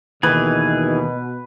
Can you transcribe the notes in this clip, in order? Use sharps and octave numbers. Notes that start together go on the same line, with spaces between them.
D#2 B2 D#3 E3 G#4 B4